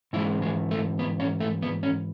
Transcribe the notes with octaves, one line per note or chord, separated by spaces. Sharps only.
G#2 E3 G#3 E4
G#3
A3
B3
C#4
A3
B3
C#4